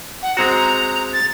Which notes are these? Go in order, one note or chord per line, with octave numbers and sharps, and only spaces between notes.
F#5
G#3 C4 F#4 A#5
A6